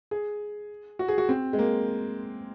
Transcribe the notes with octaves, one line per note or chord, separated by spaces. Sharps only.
G#4
F#4
G#4
F#4
C4
G#3
A#3